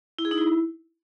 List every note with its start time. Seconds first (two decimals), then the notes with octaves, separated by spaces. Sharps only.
0.19 E4
0.25 G#4
0.31 D#4
0.38 E4